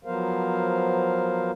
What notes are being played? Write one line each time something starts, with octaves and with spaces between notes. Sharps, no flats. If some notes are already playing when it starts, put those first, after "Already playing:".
F3 F#3 B3 A#4 C5 F5